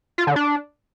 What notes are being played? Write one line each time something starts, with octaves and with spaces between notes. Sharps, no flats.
F4
D3
D4